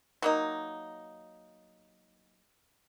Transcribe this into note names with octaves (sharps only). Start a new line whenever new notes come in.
F#3 A#3 D#4